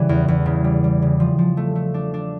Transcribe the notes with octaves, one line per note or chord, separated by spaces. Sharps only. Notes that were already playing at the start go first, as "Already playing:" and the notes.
Already playing: C#3 E3 G3
E2
E2
C#3
G3
G3
C#3
F3
F3
A3
A3
D4
D4